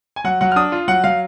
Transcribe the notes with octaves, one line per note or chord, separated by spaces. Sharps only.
G#5
F#3 F#5
F#3 F#5
F6
D4 D#6
F4
F#3 F#5
F#3 F5